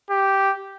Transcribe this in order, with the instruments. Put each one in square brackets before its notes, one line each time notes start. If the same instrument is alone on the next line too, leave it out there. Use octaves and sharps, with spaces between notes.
[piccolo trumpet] G4